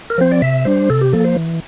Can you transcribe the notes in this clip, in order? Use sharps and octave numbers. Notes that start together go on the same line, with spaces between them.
A#4
F3 C4 C5
D5
C3 E5
G3 D4 C5
C3 A4
G4
F3 A#3 A4
C5
E3